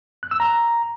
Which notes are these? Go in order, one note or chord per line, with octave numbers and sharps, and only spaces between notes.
F#6
E6
A#5